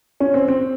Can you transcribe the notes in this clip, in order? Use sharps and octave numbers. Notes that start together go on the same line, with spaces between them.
C#4
C4
C4